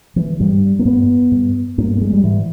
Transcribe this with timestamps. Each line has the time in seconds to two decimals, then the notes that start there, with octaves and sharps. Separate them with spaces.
0.16 E3
0.40 G2 G3
0.79 A#3
0.85 G2 B3
1.31 G2
1.78 G2 A#3
1.97 A#3
2.01 G#3
2.13 G3
2.24 G#2 E3